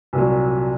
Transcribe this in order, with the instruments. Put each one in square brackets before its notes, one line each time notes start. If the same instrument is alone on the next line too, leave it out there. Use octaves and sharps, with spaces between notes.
[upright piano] C2 A#2 F#3